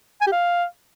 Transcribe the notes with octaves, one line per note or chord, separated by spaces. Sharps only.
G#5
G4
F5